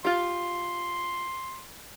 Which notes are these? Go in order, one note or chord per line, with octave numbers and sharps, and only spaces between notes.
F4 G4 C6